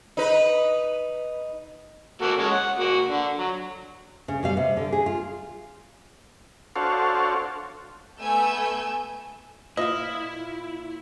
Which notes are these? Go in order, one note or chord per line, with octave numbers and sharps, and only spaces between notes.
D#4 B4
A#3 F#4 A4
G#3 C#4 A5
F#5
A#3 F#4
D3
F#3
C#3
B2 G3 F5
C3
D3
G#4
F4
D4 F#4 A4 C5 C#5 F5
A3 B3 G#5 E6 G6
A#2 E4 D#5 F5